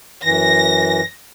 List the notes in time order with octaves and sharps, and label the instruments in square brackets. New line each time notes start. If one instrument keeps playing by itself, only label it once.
[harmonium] F#2 E3 [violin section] A#6